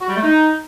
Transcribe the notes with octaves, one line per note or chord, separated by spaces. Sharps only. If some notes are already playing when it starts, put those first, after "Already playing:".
F#4
G3
A3
D#4